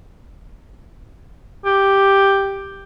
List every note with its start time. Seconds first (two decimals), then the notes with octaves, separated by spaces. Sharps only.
1.66 G4